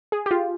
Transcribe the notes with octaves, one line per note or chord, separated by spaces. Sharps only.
G#4
G4
F4